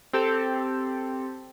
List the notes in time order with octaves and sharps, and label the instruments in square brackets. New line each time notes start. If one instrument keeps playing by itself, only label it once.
[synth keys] C4 G4 A4